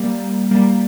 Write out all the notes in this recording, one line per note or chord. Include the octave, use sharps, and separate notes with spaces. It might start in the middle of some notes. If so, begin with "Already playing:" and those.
Already playing: G3 A#3
G3 A#3